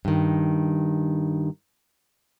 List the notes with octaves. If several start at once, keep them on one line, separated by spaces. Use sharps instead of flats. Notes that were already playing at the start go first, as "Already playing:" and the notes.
G2 D#3